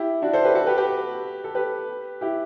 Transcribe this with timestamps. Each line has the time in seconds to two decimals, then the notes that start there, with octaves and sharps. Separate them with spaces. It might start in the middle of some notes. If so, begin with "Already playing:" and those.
Already playing: E4 G4
0.22 D4 F#4
0.33 A4 C5
0.44 G4 B4
0.55 F#4 A4
0.66 G4 B4
0.77 G4 B4
1.44 A4
1.55 G4 B4
2.21 E4 G4